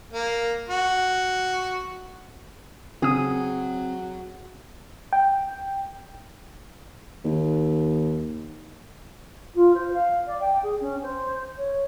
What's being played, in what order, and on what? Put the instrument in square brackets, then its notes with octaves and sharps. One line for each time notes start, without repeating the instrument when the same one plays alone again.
[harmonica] A#3
F#4
[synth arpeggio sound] C#3 D#6 [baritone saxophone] F#3 [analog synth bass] C4 [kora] G#4
[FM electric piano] G5
[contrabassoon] D#2
[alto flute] F4
C5
F5
D5
G5
G#4
C#4
C5
C#5